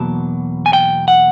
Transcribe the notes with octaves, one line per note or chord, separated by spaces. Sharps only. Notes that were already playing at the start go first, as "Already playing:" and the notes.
Already playing: E2 B2 F#3 A#3 A5
G#5
G5
F#5